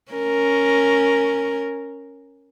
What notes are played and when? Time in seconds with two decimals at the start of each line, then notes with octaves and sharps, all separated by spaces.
0.12 C#4 A#4